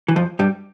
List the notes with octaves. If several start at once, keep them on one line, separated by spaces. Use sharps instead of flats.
E3
F2 F3
G2 G3